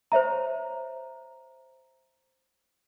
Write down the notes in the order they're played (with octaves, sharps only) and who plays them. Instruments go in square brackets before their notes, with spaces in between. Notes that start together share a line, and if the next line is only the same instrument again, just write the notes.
[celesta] C5 C#5 E5 A#5